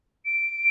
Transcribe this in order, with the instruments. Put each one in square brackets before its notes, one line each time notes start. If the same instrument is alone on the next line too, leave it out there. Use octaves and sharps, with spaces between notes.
[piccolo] D7